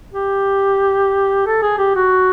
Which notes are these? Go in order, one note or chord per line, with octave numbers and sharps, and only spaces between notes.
G4
A4
G#4
G4
F#4